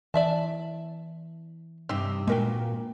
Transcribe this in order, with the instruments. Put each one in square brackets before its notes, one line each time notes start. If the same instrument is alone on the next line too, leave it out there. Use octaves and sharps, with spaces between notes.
[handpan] E3 [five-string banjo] D5 E5 A5
[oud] G2 C3 G4 [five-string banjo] C4 D#4 [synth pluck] E6
[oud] A#2 B3 F#4 [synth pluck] G#3 A#4 G5 [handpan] A#3